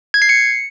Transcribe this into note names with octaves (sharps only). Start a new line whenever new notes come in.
G#6
C7
C#7